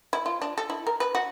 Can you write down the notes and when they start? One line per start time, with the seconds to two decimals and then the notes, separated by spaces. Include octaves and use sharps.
0.13 E4
0.26 F4
0.42 D4
0.58 A4
0.70 E4
0.87 A#4
1.00 B4
1.15 F#4